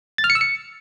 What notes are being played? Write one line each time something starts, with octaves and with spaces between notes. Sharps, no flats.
A6
F6
C#7
E6
C#7